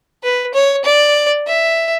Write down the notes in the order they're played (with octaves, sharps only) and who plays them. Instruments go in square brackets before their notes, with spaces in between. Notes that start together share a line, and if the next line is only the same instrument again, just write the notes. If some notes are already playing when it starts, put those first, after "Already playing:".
[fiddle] B4
C#5
D5
E5